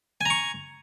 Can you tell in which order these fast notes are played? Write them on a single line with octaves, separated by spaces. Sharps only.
G#5 A#5 C#6